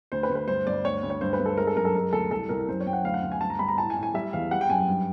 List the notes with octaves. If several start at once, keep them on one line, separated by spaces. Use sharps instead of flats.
D2 C5
B4
D2
B4
G2 C5
G2 D5
D2 C#5
D2
C#5
G2 C5
B4
G2
A4
G#3 A#4
A4
F#2 A#4
A4
G#3 A#4
D2 A4
C2 A4
C2 A#4
F#2 C5
C#5
F#2 G5
F#5
D2 F5
F#5
D2
G#5
G2 A5
A#5
G2 B5
A#5
A2 A5
G#5
A2
G#5
G3 E5
E2 F5
G3 F#5
G5
F#2 G#5
G5
G2